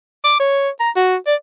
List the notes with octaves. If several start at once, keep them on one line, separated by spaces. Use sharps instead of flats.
D6
C#5
A#5
F#4
D5